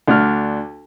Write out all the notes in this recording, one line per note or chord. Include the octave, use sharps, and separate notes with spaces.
D2 D4 F6